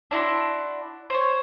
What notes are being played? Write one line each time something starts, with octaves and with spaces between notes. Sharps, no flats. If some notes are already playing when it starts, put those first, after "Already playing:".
D4 E4 F#4 C6
C5 C#5